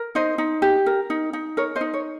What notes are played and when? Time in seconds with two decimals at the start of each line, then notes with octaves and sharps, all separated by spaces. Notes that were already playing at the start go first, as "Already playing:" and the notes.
Already playing: A#4
0.15 D#4 C5 D#5
0.38 D#4
0.62 G4
0.86 A#4
1.10 D#4
1.33 D#4
1.57 A#4 C#5
1.76 C5 D#5
1.81 D#4
1.94 C#5